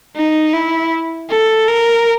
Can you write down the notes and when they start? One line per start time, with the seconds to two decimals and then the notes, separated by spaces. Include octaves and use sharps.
0.16 D#4
0.53 E4
1.30 A4
1.68 A#4